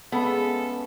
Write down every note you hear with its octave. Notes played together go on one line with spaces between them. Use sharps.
C#3 G#3 A3 B3 C#4 A4